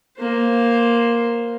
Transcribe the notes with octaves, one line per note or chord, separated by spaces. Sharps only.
A#3 C5